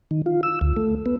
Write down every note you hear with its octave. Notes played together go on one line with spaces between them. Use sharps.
D#3
F4
E6
D2
A3
B3